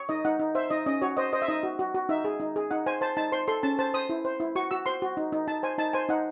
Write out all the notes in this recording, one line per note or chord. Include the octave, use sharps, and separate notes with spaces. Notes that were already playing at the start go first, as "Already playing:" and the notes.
Already playing: C#5
D#4 D#5
D#4 F#5
D#4
C5 E5
D#4 D#5
C#4 D#5
F#4 C#5
C5 D#5
C5 D#5
E5
D#4 D#5
F#4
F#4
F#4
D#4 E5
G#4
D#4
G#4
D#4 F#5
C5 G#5
C5 A5
D#4 A5
C5 C6
A4 C6
C#4 A5
C5 A5
C5 D#6
E4
C5
E4
F#4 C#6
F#4 E6
C5 C6
F#4
D#4
D#4
D#4 A5
C5 G#5
D#4 A5
C5 G#5
D#4 F#5